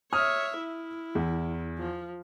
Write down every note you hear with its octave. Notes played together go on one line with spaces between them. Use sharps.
C#5 E5 D#6 F6
E4
E2
F3